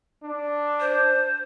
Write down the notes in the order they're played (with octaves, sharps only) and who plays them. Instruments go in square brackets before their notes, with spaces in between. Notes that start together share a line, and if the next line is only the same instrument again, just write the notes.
[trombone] D4
[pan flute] C5